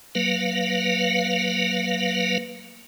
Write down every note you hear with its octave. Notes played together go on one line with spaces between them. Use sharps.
F#3 A#3 B4 F5